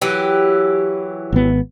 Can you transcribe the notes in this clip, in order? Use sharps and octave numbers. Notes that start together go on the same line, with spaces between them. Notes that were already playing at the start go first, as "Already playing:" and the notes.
E3 F#3 G4
G#1 B3